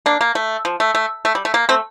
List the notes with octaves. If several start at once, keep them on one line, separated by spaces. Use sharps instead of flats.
A#3 D4
A#3
A3
F3
A3
A3
A3
G3
A3
A#3
A3 C4